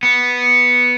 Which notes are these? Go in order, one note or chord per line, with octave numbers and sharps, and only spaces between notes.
B3